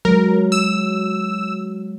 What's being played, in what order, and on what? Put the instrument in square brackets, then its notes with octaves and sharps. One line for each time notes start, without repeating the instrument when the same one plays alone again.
[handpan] F#3 G#3 [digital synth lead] A#4
[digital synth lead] E6